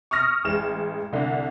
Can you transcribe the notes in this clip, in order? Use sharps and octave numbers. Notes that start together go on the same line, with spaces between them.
C#6 D#6 F6 A#6
A1 G#3 E7
C2 D3